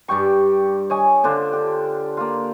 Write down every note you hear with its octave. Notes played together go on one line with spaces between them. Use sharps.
G2 G3 G5 C#6
C#5 D#5 G#5
D3 D4 F4 C5
G4
A#3 F4